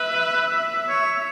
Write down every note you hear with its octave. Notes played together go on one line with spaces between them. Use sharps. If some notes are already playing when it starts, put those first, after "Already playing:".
Already playing: B4 E5
C#5